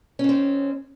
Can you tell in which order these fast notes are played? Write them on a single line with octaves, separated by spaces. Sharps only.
C#4 D#3 C4